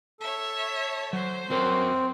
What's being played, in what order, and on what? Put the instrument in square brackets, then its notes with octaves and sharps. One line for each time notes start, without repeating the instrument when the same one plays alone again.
[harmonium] A4 [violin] C#5 E5
[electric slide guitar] F#3 [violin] C5
[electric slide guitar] F#3 A#4 C#5 [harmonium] C4